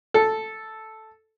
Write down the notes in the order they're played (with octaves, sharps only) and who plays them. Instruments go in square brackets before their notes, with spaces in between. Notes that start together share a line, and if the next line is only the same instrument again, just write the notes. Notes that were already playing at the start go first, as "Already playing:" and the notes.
[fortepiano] A4